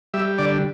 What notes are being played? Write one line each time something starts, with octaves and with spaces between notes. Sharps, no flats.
G3 E5
D3 D5